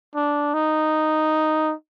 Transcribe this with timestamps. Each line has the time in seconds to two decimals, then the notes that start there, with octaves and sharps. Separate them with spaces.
0.15 D4
0.54 D#4